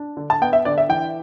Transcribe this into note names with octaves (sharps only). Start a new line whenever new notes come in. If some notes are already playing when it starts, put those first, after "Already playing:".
Already playing: D4
D3
A5
B3 G5
E5
D3 D5
E5
E3 G5